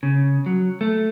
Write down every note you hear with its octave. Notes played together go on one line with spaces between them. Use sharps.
C#3
F#3
A3